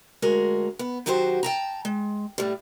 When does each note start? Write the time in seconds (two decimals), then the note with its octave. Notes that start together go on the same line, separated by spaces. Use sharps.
0.22 D2 G#3 F#4 A#4
0.79 B3
1.06 D#3 F#3 F#4 G4 C5
1.43 G5 A5 A#5
1.85 G#3
2.38 A2 G3